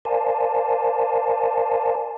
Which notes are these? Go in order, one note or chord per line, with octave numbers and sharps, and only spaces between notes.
A#4 C5 D5 F5 G#5 A5